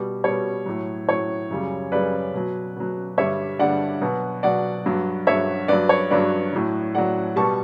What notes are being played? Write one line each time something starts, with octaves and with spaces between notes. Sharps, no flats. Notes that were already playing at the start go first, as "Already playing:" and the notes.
Already playing: B2 G3
B2 G3 C#5
A2 F#3
A2 F#3 C#5
F#2 C#3 G3
F#2 C#3 G3 B4 D5
B2 F#3
B2 F#3
G2 D3 G3 C#5 E5
G2 D3 G3 D5 F#5
B2 F#3
B2 F#3 D5 F#5
G2 F#3
G2 F#3 C#5 E5
G2 F#3 B4 D5
C#5
G2 F#3 B4 D5
A2 F#3
A2 F#3 D5 F#5
B2 G3 A5 C#6